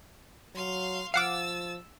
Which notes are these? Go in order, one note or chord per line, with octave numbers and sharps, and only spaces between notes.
F#3 F5 C6
F3 F5 F#5 D6 E6 A6